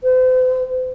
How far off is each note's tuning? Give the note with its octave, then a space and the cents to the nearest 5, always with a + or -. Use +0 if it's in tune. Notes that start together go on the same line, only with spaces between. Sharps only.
C5 -40